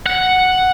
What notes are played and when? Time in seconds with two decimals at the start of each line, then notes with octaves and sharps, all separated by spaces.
0.06 F#5